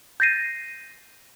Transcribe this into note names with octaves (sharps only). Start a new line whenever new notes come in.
G6 A6 A#6 C7 D#7